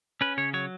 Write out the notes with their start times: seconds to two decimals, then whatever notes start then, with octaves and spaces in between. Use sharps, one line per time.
0.21 C#4 B4
0.37 C#3 C#5
0.54 F#3 C#5